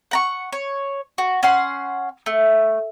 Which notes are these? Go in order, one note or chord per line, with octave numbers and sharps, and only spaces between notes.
F#5 A#5 C#6
C#5
F#4
C#4 F#5 C6
A3